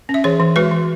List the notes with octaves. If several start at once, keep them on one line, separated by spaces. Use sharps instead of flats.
C#4
E5
E3 G#4 C#5
E3
G#3 F#4 B4
E3